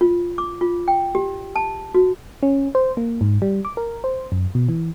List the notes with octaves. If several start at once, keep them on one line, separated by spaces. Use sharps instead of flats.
F4
D6
F4
G5
G4
A5
F#4
C#4
C5
A#3
G#2
G3
D6
A#4
C5
F#2
B2
E3